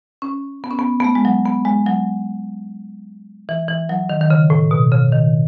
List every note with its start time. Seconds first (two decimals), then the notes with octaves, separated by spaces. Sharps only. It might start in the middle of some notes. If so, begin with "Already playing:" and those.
0.22 C#4
0.64 B3
0.71 C#4
0.79 B3
1.00 B3
1.04 A3
1.15 G#3
1.25 F#3
1.45 B3
1.65 G#3
1.86 F#3
3.49 E3
3.69 E3
3.89 F#3
4.09 D#3
4.21 D#3
4.30 C#3
4.50 A2
4.71 B2
4.92 C#3
5.12 D#3